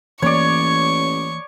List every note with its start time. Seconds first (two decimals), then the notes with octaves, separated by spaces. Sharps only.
0.22 A1 E3 A#3 C#5 D5 C#6